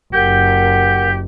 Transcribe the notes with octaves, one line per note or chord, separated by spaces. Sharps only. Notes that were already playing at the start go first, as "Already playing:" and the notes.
F#1 G4 A#4 F#5 G6